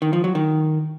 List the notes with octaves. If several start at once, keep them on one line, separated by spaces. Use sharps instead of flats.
D#3
F3
F#3
D#3